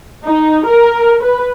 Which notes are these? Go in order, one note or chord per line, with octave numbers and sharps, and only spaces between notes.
D#4
A#4
B4